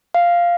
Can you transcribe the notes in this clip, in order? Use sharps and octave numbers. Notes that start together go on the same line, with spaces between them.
F5